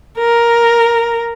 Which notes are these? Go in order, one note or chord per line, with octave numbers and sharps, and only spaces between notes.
A#4